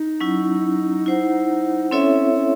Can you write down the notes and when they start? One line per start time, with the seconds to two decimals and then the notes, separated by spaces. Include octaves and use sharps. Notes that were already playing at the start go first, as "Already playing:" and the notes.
Already playing: D#4
0.20 F#3 C#4 E4
1.06 E4 C5 F#5
1.91 C4 C#4 E4 A4 C#5 E5
2.34 C#4